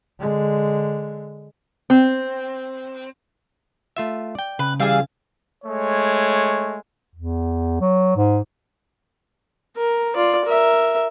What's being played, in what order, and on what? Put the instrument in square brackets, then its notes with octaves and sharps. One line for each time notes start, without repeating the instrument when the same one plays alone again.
[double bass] D3 G#3
[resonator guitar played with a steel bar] C4
[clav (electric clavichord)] A3 F4 E5
D5 G5
[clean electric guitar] C#3 [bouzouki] B4
[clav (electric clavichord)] E3 G3 [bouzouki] G#4 E5 F5
[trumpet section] G#3 A3 C#5
[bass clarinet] E2
F#3
G#2
[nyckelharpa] A#4
F4 D5
A#4 E5